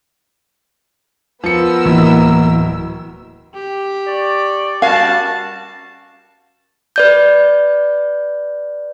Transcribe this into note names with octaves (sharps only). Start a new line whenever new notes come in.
F3 B3 A#4 E6 C#7
D1 E3 A#3 E4
G4
D5 C#6
G3 C#4 F#4 A#4 F5 A5
B4 D5 G6